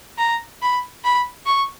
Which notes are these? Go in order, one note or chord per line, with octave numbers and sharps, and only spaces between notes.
A#5
B5
B5
C#6